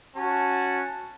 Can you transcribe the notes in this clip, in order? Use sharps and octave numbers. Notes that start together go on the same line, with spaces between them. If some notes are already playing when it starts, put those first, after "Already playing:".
C#4 F#4 A5